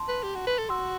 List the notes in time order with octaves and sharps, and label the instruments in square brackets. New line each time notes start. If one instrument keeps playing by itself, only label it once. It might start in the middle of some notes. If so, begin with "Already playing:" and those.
Already playing: [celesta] A5 C6
[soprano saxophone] B4
G4
F#4
B4
A4
[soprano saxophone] F#4 [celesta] C6 E6